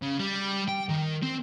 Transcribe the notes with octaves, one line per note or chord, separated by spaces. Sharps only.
C#3
G3
G5
D#3
C4